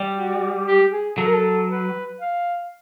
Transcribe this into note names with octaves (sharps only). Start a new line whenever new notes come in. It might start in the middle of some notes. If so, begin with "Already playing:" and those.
Already playing: G3
F#4
G4
G#4
F#3 A4
A#4
A4
B4
F5